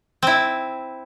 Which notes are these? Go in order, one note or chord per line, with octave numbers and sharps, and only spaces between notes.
C4 E4